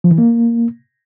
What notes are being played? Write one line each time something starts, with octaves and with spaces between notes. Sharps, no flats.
F3
E3
A#3